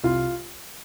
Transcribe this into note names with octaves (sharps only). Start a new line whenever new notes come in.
C2 F4